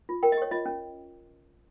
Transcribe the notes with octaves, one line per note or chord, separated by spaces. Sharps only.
F4
A#4 G5
D#5
G4 C#5
F4 D#5
C#4